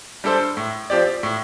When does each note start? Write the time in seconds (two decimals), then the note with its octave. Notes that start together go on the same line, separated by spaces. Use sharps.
0.24 G3 D4 A4 C5
0.57 A2
0.90 F3 C4 G4 D5
1.23 A2